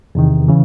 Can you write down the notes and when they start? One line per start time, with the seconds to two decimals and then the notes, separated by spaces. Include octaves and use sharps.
0.15 E2 C3 D#3
0.48 C#3 E3